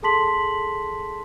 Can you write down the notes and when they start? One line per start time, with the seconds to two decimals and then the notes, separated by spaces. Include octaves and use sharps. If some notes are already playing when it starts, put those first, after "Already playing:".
0.02 G#4 A4 A5 C6 B6 F#7